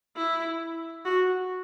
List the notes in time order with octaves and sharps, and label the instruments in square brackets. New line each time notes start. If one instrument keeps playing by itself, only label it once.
[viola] E4
F#4